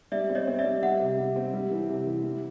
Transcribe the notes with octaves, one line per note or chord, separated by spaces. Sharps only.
G3 D5 E5
C4
C#5 D#5
C4
D5 E5
G3
G3 E5 F#5
C3
G3
C4
G3
E3
C3
E3
G3